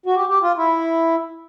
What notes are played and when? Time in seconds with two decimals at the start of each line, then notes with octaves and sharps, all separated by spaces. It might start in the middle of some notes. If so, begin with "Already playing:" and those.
0.06 F#4
0.15 G4
0.29 G4
0.43 F4
0.57 E4